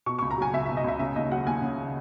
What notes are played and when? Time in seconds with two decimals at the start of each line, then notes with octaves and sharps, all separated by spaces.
0.06 B2 C#6
0.19 C#2 C#6
0.31 A#5
0.38 F#3 G#5
0.53 C#2 E5
0.65 B2 E5
0.77 D#5
0.84 C#2 E5
0.99 C#3 E5
1.16 D#2 D#5
1.31 F#3 F#5
1.46 D#2 G#5
1.62 C#3